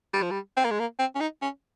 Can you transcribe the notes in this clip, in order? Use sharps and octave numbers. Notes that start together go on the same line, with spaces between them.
G3
F3
G3
C4
A#3
G#3
A#3
C4
C#4
D#4
C#4